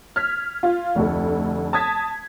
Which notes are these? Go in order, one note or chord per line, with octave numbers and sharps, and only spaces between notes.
F6 G#6 B6
F4
F1 D2 A4
A5 D#6 G#6 B6